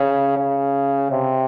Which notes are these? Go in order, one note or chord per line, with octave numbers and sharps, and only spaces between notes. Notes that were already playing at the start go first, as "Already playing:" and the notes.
Already playing: C#3
C#3
C3